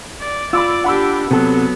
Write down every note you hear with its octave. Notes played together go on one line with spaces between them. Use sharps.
D5
F4 D5 B5 D6 E6
D4 G4 F#5 B5 E6
C3 F#3 B3 A4